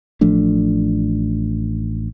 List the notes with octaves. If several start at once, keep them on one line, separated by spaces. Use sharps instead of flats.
A1 F3 A3 D4